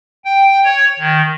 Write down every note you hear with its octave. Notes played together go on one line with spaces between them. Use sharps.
G5
C#5
D#3